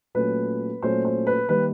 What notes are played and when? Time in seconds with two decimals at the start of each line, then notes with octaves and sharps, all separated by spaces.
0.15 A#2 F#3 A3 C#4 B4
0.82 A#2 F#3 A3 C#4 C5
1.05 C5
1.27 B4
1.49 D#3 G3 A#3 B4